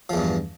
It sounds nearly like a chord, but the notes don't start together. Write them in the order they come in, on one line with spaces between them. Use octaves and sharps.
F3 E2 G2